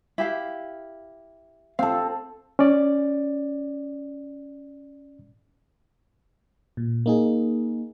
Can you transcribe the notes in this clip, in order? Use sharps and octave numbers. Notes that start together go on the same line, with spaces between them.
E4 G4 F5
C4 A4 F5
C#4 D5
A#2
A#3 D#4 G#4